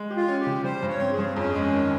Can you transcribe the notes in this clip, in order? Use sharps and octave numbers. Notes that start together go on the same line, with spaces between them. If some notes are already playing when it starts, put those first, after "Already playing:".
Already playing: G#3
G4
F4
C#4
G4
C#3
G3 C5
G2
C#5
C4
G#4
G2
F2 C#4
G#3
D#3